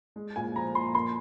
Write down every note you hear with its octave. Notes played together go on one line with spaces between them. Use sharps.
G#3
A#2 G#5
F3 A#5
A#2 C6
A#3 C6